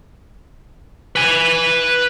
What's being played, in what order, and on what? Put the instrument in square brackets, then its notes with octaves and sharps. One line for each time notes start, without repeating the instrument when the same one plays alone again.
[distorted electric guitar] B4 G#5